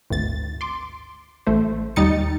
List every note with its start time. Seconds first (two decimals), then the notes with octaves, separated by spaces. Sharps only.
0.10 G#1 D2 A6
0.61 C6 D6
1.47 A1 A3 C5
1.96 D#2 G3 D#4 A6 C#7